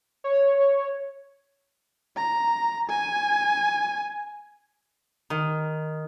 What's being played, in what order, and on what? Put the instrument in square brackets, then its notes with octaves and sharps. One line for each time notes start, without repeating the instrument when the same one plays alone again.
[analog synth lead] C#5
[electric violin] A#5
G#5
[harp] D#3